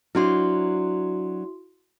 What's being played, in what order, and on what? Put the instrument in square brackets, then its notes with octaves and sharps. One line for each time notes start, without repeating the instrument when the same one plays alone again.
[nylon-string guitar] F#3 D4 C5 [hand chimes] E4 F#4 C6